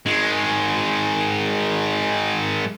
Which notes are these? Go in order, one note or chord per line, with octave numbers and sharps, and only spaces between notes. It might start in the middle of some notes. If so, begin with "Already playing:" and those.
D#3 G#3